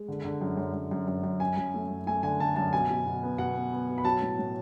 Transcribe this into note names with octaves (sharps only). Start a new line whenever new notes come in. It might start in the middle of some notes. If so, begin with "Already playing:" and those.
Already playing: G#3
D3
D3
F#2
F#2
F#2
F#2
F#2
F#2
F#2 G#5
F#2
A3
F#2
A3 G#5
D3 G#5
D3 A5
F#2 A5
B2 G#5
B2
B2
B3
B2 F#5
B3
B3
B2
B5
F#3 A5
A2
A2